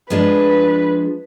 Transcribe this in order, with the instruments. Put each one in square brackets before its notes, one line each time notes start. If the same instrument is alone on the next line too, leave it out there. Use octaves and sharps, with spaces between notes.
[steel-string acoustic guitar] F3 G#3 D4 [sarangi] B4